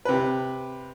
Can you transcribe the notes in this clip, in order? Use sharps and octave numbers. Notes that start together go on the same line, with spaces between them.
C3 B4